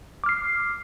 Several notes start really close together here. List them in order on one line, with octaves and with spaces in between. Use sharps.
D6 F6 C7